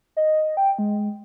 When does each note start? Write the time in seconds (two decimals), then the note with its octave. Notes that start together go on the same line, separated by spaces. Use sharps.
0.17 D#5
0.57 G5
0.79 G#3